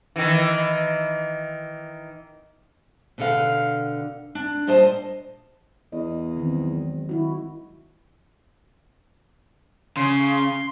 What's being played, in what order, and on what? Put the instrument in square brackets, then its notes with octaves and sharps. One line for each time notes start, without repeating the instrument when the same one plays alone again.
[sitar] D#3 E3
[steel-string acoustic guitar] B2 D3 F5
D4
A#2 G3 C5 D#5 A5
[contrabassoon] E2 [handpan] D#5
[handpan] D#3 C4
F#3 G#3
D#3 E4 F#4
[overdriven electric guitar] C#3 [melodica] C6